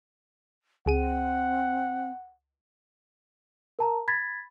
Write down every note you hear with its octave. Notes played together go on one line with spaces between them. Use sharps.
C#2 C4 G#4 F#5 D#7
A#4 A5 A#5
B5 G#6 A6 B6